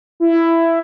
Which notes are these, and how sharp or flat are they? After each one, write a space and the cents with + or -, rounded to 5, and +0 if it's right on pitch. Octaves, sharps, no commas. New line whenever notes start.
E4 +10